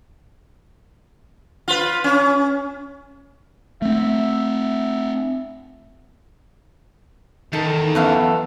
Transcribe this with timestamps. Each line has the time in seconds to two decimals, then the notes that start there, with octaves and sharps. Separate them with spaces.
1.68 F4 B4
2.04 C#4
3.82 A3 C4 E5
7.53 E2 D#3 D#4 A4
7.95 F#2 E3 B3 A4 F5